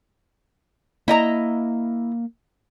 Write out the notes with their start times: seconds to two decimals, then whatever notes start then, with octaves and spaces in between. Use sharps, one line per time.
1.08 A#3 E4 D#5 A#5